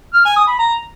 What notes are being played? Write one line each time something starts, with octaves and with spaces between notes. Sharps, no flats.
F6
G#5
D#6
B5
A#5